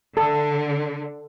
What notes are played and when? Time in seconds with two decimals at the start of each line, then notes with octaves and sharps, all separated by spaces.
0.17 D3 A4